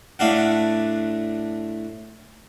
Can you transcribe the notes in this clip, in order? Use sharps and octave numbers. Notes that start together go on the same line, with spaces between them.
A2 A3 D4 F5 F#5